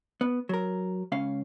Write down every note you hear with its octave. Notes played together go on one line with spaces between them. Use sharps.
B3
F#3 A#4
C#2 C#4 F5